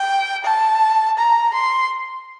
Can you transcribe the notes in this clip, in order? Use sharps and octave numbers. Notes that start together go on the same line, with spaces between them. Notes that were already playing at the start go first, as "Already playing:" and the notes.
Already playing: G5
A5
A#5
C6